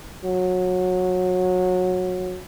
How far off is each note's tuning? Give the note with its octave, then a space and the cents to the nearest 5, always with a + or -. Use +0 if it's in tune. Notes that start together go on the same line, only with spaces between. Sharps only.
F#3 -20